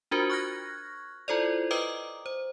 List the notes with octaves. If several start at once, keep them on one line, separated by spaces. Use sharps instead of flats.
D4 F4 F#4 A#4 C5
C#6 F6 F#6 G#6 A#6
E4 F4 A4 C5 D5
B4 D#5 G5 A#5 D6 D#6
C5